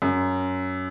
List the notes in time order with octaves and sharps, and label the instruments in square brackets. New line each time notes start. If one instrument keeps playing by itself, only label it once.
[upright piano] F#2